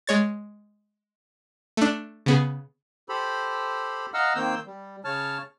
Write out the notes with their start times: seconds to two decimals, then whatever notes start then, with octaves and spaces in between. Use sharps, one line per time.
0.07 G#3 C#5 A6
1.77 A3 D4
2.26 C#3 B3 G#4
3.09 G4 A4 C5 B5
4.14 D#5 F5 F#5 A#5 E6 F6
4.36 D#3 A#3 C4 E6 G6
4.66 G3
5.05 C#3 C#5 A5 F6